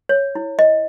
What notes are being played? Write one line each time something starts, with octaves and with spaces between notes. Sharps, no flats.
C#5
E4
D#5